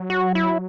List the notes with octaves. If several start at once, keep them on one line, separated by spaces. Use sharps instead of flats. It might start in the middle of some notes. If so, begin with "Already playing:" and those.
Already playing: F#3
F#4
E4